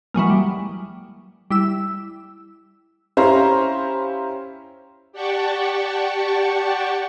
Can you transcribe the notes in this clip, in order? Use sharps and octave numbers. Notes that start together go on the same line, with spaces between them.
E3 F#3 G#3 A#3
G3
G3 E4 E6
C#4 E4 G4 C5 F5 A#5
G4 D5 F#5 G5 A5 C#6